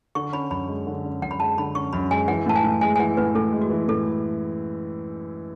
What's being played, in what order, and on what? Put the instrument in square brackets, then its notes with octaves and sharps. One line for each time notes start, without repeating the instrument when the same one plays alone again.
[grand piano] D3 [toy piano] C#6
[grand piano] C#4 [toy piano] B5
[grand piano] F#2 [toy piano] B5
[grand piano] G#3
D3
C#4
[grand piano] F#2 [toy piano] F#5
[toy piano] B5
[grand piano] G#3 [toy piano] A5
[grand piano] D3 [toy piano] B5
[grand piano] C#4 [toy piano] C#6
[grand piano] F#2 [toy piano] B5
[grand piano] G#3 [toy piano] G#5
[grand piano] E3 [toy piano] F#5
[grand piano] A2 [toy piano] A5
[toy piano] G#5
[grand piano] A2
[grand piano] G#3 [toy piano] G#5
[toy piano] G#5
[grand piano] E3 [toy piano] F#5
[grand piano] A2 [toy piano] B4
[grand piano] A2 [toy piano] A4
[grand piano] G#3
[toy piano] F#4
[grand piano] E3
[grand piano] A2 [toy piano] A4